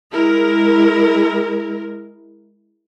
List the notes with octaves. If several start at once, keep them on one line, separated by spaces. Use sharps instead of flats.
G#3 E4 A#4